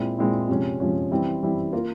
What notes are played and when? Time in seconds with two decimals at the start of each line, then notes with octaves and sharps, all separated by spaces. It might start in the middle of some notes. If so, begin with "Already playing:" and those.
Already playing: A#2 G#3 C4 E4
0.19 A#2 G#3 C4 E4
0.49 C3 F3 G#3 C#4
0.80 C3 F3 G#3 C#4
1.12 E3 G3 C4 E4
1.43 E3 G3 C4 E4
1.73 A#3 F4 A#4